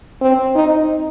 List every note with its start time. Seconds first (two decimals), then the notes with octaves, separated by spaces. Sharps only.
0.22 C4
0.55 D#4